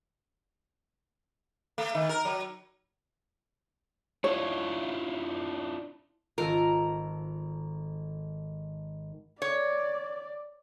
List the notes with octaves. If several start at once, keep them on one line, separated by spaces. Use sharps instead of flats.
A3
D#3
A#4
F#3
D4 E4 F4 C#5
G#1 D#3 F4 A4 A#4
C#5 D5